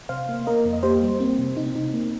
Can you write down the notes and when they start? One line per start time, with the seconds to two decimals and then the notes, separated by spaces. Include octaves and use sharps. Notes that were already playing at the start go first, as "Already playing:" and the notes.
0.09 C3 C5 F5
0.29 A#3
0.47 A#3 A#4 D#5
0.65 F2
0.73 D#5
0.83 A#3 G4 C5
1.02 G3
1.20 A#3 C4
1.39 C3
1.57 C3 D#4
1.66 C4
1.75 C3 D#4
1.93 A#3